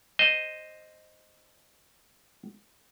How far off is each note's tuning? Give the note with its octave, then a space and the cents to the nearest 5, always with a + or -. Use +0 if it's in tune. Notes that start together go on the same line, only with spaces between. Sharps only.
C5 +0 D#5 +0